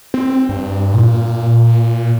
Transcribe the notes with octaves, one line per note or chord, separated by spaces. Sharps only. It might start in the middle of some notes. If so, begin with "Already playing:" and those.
C4
G2
A#2